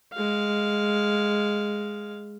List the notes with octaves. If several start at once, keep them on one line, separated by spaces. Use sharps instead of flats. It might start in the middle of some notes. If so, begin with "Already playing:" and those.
G#3 F5